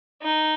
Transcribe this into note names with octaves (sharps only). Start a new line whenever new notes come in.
D#4